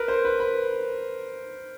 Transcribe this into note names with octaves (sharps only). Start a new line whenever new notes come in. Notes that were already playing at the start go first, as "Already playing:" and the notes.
Already playing: A#4 B4
C5
B4
B4